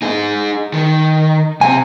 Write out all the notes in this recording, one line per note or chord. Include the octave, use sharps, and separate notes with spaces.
D#4 G#4
D#3
C3 G#5